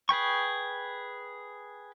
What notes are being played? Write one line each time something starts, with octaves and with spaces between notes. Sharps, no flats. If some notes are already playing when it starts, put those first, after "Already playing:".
G#4 B4 G5 C#6